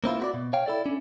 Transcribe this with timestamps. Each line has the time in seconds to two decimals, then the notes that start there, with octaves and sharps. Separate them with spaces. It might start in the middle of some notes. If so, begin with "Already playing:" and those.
0.04 A#3 C4 E4 F4
0.20 F#4 B4 D5
0.34 B2
0.53 C#5 F5 G5
0.66 E4 A4 D5
0.86 C#4 D4